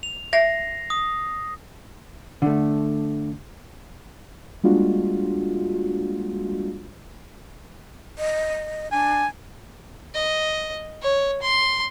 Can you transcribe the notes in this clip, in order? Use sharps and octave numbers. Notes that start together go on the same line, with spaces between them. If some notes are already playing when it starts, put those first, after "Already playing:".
F7
E5 A#6 C7
D#6
D3 A3
G3 G#3 A#3 D4 F4 F#4
D#5
D4 G#5
D#5
C#5
C6